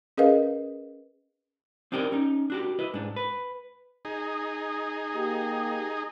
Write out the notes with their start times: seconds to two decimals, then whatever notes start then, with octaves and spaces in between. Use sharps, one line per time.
0.18 C#4 G#4 A#4 B4 D#5 F5
1.92 C4 D4 D#4 G4 A#4 D5
2.12 C#4 D#4
2.50 D4 F#4 G4
2.79 E4 B4 D#5
2.94 G#2 D4
3.16 B4
4.05 D#4 G#4
5.15 A#3 G4